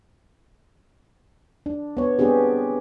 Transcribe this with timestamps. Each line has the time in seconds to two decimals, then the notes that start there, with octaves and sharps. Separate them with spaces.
1.66 D4
1.97 B3 C#5
2.19 B3 C4 D4 G4 G#4